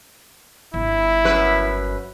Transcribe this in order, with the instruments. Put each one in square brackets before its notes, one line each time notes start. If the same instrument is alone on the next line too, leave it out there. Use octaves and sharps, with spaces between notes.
[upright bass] G1 [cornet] E4
[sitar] F#2 B4